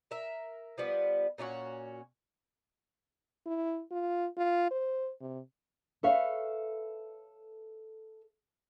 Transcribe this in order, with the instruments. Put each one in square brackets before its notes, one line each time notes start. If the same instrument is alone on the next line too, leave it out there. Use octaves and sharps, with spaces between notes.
[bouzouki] A#4 E5
F3 G3 B3
A#2 C#4 F4 F#4
[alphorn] E4
F4
F4
C5
C3
[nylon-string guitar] A4 B4 C#5 E5 F5